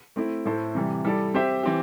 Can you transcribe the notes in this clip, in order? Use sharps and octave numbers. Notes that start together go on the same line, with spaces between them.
A3 C4 E4
A2 A3 E4 A4 C5
C3 E3 G3
G3 E4 A4 D5
C4 G4 C5 E5
E3 C4 G4